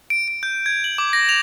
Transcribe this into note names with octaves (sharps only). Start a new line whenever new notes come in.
D7
D7
G6
G#6
F#7
D6
A#6
F7